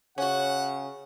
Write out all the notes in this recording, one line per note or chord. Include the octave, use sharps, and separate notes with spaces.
C#3 C#4 F#4 F#5